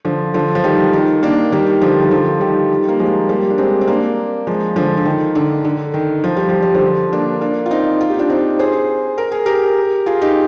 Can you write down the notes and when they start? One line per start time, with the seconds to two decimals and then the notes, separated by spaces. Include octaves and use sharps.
0.05 D3 F3
0.34 D3 F3
0.55 F3
0.64 D#3 G3
0.93 D#3
1.23 A#3 D4
1.52 D#3 G3
1.82 D3 F3
2.01 D#3
2.11 D3 F3
2.41 D#3 G3
2.88 A#3
3.00 F3 G#3
3.29 G3 A#3
3.50 D4
3.58 G#3 C4
3.81 C4
3.87 A#3 D4
4.47 F3 G#3
4.76 D3 F3
4.97 D3
5.05 D#3
5.35 D3
5.64 D3
5.94 D#3
6.24 F3
6.37 G3
6.49 F3
6.62 G3
6.75 D3 F3
7.12 A#3 D4
7.41 A#3 D4
7.66 F4
7.70 C4 D#4
8.01 F4
8.10 G4
8.19 D4 F4
8.29 C4 D#4
8.59 G#4 C5
9.18 A#4
9.32 G#4
9.46 G4 A#4
10.06 F4 G#4
10.21 D#4 G4